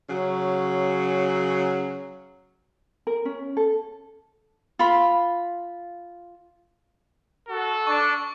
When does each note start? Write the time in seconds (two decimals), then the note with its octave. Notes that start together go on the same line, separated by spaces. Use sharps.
0.09 C#3 F#3
3.07 A#4
3.25 C#4
3.57 A4
4.79 F4 B5
7.49 F#4 A4
7.87 D4 C#6